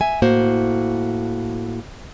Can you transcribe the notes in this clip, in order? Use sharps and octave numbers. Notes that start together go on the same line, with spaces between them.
E5 G#5
A2 A#3 F#4 C5